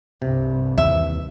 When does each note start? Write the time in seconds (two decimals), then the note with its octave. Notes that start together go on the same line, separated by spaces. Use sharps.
0.22 C2 G2 C3
0.78 D#2 E3 E5